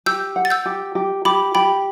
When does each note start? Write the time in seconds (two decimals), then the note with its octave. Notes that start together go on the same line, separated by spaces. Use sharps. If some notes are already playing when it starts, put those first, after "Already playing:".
0.06 G4 E6 G6
0.36 F#5
0.45 A6
0.50 E6 G6
0.66 G4
0.95 G4
1.25 G4 B5 D6
1.55 G4 G5 B5